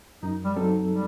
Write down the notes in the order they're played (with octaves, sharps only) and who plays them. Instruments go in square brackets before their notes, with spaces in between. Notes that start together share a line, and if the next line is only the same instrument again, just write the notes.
[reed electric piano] F#2 [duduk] D#4
[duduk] G3
[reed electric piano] F#3 C4 D#4 A4
[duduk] G3